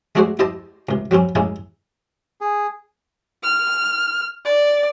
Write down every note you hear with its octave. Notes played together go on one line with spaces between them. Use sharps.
G#3 A3 D4 F#4 G#4 C5
E4 G4 C5 D#5 A5
C#2 C3
F#3 G3 C4 C#4
G#3 A#3 C#4 D#4 E4
G#4
F6
D5